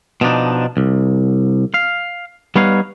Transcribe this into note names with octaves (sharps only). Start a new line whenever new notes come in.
B2 F3 D4 D#4
C2
F5
G3 B3 D#4 B4 C#5 F5